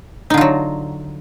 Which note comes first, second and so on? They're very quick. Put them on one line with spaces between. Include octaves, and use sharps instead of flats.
D#4 D3 F4 F#3